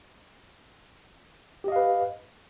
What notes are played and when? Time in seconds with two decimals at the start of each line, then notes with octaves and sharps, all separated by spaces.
1.64 G4
1.68 D#5
1.72 F5
1.76 B4